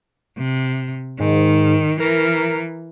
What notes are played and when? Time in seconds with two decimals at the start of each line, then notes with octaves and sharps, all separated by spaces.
0.38 C3
1.20 G#2 D#3
2.00 E3 A#4